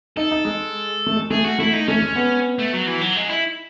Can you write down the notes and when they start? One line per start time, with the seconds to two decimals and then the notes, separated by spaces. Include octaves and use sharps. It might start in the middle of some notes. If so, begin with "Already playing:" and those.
0.17 D#4 A4
0.32 D#4
0.45 G#3
1.07 A3
1.16 G#3
1.31 A3 G#4
1.44 F#4
1.59 A3 E4
1.73 D#4
1.88 A3 C#4
2.02 G#3
2.15 B3
2.59 A3
2.73 F#3
2.87 E3
3.01 F#3
3.16 G#3
3.30 E4